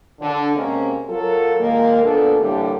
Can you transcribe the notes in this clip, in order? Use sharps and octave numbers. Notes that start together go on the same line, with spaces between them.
D3
C3 G#3 A#3 C4 C#4
F#3 F4 A4 A#4
A#2 D#3 G#3 A#3
A#2 B3 D4 A4
A2 D3 E3 G3 A#3